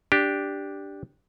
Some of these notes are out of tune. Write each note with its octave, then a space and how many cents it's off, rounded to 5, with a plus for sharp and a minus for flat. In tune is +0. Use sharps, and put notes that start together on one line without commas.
D4 -5 G4 +0